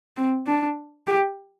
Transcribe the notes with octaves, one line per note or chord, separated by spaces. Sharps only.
C4
D4
G4